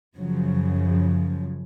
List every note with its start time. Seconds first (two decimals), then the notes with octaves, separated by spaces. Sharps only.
0.16 F#2 C#3 F3 F#3
0.80 F3